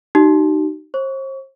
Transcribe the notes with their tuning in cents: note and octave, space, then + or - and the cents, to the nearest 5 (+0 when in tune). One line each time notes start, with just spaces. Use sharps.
D#4 -15 G4 -45
C5 +40 C#6 +35